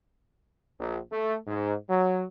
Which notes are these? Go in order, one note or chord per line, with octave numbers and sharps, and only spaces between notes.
A#1
A3
G#2
F#3